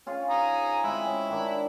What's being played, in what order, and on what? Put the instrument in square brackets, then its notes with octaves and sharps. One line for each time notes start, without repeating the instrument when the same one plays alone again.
[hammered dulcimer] C#4 F4 G#4
[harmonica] G#5 A#5 D#6
[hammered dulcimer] G#3 C4 [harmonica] E4
[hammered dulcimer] C#4
D#3 D4 D#4